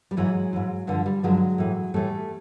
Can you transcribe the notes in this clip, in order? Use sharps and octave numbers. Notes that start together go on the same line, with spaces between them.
G3
G#2 E3 F#3 G#3
G#2 E3
G2 D3 F3 F#3
G3
G2 D3 F3 F#3 G#3
A2 E3
A2 E3 G3 A3